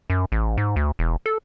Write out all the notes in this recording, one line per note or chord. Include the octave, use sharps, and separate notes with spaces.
F#2
A1
G#2
D2
E1
A4